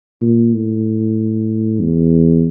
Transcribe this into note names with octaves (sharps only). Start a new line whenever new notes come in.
A#2
A2
E2